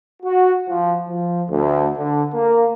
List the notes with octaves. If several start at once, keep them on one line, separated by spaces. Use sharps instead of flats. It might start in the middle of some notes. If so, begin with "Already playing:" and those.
F#4
F3
F3
D2
D3
A#3